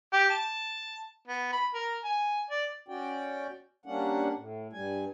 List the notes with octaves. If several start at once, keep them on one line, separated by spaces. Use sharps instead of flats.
G4
A5
B3
B5
A#4
G#5
D5
C#4 F#4 D5 G5
G3 A#3 C#4 D4 F#5
A2
G2 G3 G#5